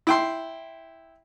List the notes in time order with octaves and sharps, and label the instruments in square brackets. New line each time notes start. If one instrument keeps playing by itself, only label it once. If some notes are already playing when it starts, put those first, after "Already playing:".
[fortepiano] E4 G5 C6